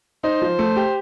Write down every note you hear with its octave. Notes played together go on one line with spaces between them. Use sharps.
D#4 C5
F3
A3
G4